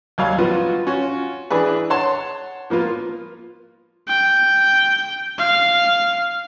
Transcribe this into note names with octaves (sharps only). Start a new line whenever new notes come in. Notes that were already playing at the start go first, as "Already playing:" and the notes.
D#2 F#3 G3 F5
F3 B3 F4 F#4
C#4 F4 F#4
E3 D4 G#4 B4
C#5 F#5 A5 C6
F3 A#3 B3 F4
G5
F5